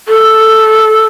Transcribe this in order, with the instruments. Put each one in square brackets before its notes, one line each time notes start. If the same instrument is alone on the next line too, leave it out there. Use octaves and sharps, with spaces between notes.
[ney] A4